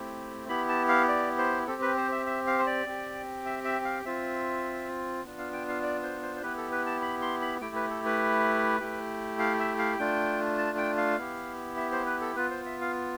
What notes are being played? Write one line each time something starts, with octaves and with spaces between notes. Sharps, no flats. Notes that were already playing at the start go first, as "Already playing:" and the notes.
Already playing: A3 C4 E4 G4
B3 E4 G4 B5
A5
F5
D5
C5
C4 G4 A4
B4
C5
E5
E5
F5
C5
D5
C4 G4
E5
E5
F5
C4 F4 E5
B3 D4 F4
F5
G5
F5
D5
C5
C5
C5
B3 E4 G4 B4
A4
B4
A5
B5
C6
B5
A3 E4 G4 G5
B4
A4
B4
A3 E4 G4
F5
E5
F5
A3 D4 F4 G5
A5
G5
F5
B3 E4 G4
E5
C5
B4
A4
B3 F4 B4
C5
E5
F5